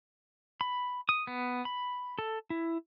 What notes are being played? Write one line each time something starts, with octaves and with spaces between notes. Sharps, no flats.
B5
D#6
B3
B5
A4
E4